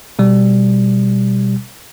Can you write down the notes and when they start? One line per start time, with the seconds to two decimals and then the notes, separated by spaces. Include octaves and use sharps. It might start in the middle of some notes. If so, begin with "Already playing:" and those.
0.19 B2 G3